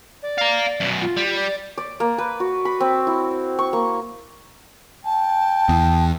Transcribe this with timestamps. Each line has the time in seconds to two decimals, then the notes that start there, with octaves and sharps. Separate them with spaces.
0.23 D5
0.38 F5 A#5
0.80 F#2 B2
1.02 F4
1.17 G3
1.36 D5
1.78 D5
2.00 A#3
2.18 B4
2.40 F#4
2.65 B5
2.80 C4
3.07 E4
3.59 C#6
3.73 A#3
5.05 G5 A5
5.69 E2